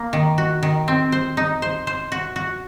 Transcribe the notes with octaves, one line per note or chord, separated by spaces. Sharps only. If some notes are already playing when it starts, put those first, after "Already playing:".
Already playing: A#3
D#3
F#4
D#3
C4
C5
D#4
C5
C5
F#4
F#4